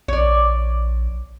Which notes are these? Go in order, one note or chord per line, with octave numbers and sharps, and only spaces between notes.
A#1 C#5 D5